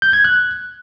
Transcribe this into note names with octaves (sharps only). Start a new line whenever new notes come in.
G6
G#6
F#6